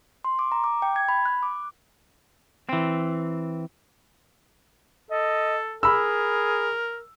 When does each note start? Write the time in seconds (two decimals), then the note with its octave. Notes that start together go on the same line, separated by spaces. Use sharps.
0.25 C6
0.39 D6
0.52 A#5
0.64 D6
0.82 G5
0.96 G#6
1.09 B5
1.26 F#6
1.43 D6
2.69 E3 C4
5.11 A4 D#5
5.83 G#4 A#4 B5 E6